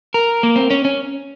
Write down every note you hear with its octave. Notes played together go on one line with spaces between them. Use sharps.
A#4
A#3
C4
C#4
C#4